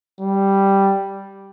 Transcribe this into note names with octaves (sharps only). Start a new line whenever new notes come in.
G3